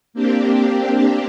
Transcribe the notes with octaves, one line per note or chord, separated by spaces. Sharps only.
A#3 C4 D4 G4